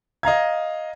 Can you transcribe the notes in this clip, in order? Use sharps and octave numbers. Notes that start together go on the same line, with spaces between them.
D#5 F5 A#5 G#6